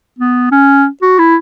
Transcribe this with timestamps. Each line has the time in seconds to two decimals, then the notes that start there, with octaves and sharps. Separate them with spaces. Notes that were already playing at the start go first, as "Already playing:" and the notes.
0.19 B3
0.51 C#4
1.02 F#4
1.18 E4